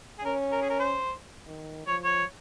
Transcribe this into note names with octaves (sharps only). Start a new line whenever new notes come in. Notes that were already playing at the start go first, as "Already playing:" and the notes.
G#4
C#4 A#4
A#4
G#4
A#4
C5
D#3
F3 C#5
C#5